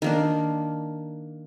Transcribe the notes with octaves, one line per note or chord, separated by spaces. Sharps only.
D#3 A#3 D4